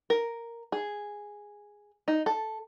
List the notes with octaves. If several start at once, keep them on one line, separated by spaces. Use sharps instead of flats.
A#4
G#4
D#4
A4